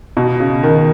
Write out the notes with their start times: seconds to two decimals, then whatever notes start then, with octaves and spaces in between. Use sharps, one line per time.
0.17 B2
0.40 C#3
0.63 D#3